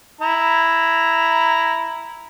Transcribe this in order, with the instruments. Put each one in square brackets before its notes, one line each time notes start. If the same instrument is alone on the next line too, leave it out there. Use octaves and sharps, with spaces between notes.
[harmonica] E4 A#5